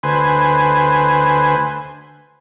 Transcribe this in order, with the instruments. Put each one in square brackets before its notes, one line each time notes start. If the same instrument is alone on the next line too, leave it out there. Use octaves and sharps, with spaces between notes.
[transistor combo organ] D2 B4 C5 G#5